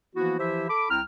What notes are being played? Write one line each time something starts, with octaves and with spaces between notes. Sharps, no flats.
E3 F3 A#3 B3 E4 F#4
E3 F3 E4 G4 C5 E5
A4 B5 D6
C2 C4 E4 G5 A#5 F6